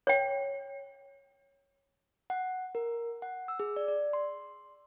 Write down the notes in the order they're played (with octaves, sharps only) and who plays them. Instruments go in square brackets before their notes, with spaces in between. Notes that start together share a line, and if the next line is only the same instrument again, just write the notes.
[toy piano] C#5 G5
[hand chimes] F#5
A#4
F#5
E6
G#4
D5
D5
C6